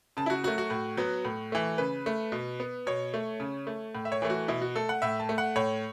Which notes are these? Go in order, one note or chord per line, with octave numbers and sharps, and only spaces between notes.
C#3 A5
E4
F#4
F#3 A3 F#4
F#4
A2
F#3 B3
A2
E3 A3
C#3 B4
A3
B2
B3
B2 C#5
A3
C#3
A3
A2
E5
C#5
E3 A3
F#4
B2 E4
F#4
A3 A4
F#5
A2 E5
A5
A3
F#5
A2 C#5